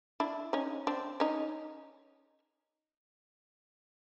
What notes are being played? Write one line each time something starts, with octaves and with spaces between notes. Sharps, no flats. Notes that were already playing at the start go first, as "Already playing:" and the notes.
D4 E4
C#4 D#4
C4 D4
C#4 D#4